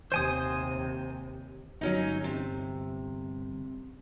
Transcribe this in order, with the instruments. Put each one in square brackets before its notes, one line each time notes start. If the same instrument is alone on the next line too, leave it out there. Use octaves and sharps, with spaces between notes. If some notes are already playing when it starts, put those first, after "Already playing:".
[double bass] D#2 C3 [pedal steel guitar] C5 G#5 D#6
[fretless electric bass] G1 [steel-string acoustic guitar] F#3 C#4 D#4
[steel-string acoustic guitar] C3